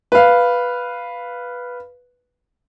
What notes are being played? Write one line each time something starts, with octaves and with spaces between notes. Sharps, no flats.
B4 F5